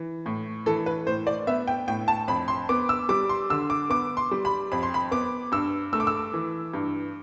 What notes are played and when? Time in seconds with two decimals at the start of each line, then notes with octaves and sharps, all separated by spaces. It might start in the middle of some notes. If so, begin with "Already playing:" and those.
Already playing: E3
0.26 A2
0.66 E3 A4
0.86 B4
1.06 A2 C5
1.27 D5
1.47 B3 E5
1.68 G5
1.88 A2 G5
2.08 A5
2.28 F2 B5
2.48 C6
2.69 B3 D6
2.89 E6
3.09 G3 D6
3.29 C6
3.50 D3 E6
3.70 D6
3.90 B3 D6
4.17 C6
4.31 G3
4.45 B5
4.72 F2 B5
4.83 C6
4.94 B5
5.11 B3 D6
5.52 G2 E6
5.93 A3 E6
6.00 D6
6.07 E6
6.33 E3
6.74 G2